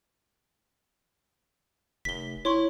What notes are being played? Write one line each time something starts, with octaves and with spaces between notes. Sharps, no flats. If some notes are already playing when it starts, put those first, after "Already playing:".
F1 B6 G7
E4 C#5 C6 C#6